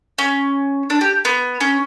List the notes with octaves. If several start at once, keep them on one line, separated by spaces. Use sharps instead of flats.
C#4
D4
G4
B3
C#4